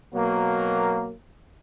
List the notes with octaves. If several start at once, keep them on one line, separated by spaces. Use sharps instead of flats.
B2 F#3 A#3